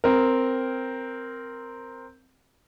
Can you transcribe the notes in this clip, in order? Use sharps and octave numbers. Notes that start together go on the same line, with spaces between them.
C4 A#4